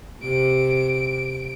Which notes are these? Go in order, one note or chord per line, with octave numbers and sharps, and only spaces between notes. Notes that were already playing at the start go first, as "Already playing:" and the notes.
C3 D7